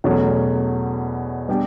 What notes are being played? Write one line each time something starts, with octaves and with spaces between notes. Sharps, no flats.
E2 B2 F#3 A3 C#4
G3 B3 D4 G4